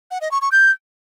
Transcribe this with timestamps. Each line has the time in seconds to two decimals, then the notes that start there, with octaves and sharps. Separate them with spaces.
0.11 F#5
0.21 D#5
0.31 C#6
0.41 C#6
0.52 G6